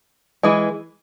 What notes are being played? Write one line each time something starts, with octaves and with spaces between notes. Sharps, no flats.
E3 G#3